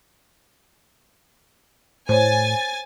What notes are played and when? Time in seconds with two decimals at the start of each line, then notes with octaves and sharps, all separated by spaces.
2.09 A2 C5 C#5 G#5 A6